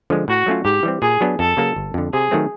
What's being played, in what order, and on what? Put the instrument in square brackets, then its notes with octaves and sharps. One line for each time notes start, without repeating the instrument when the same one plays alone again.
[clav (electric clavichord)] D3 F3 G#3
[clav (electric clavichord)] A2 [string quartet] F#4
[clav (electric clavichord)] F#3 A3 C#4 F4
[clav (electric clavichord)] G#2 [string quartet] G4
[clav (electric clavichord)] E3 G3 C4
[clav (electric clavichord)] A#2 [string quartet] G#4
[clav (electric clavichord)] F#3 B3 D4
[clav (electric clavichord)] F2 [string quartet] A4
[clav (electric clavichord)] C#3 F#3 A#3
G1
F2 D3
[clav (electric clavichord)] C3 [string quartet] G#4
[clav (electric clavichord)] D#3 F#3 A3 C4